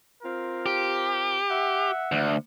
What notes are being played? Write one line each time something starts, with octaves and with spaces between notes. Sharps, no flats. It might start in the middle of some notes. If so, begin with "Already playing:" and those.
C4 F4 A#4
G4
E5 F#5
D2